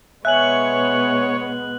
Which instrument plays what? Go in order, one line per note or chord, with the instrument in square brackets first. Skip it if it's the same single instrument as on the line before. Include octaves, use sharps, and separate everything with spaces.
[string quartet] B2 G#3 B3 [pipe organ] C#5 [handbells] E5 G#5 [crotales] F#6 F#7